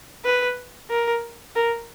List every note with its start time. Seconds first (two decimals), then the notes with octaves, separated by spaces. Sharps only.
0.25 B4
0.90 A#4
1.56 A#4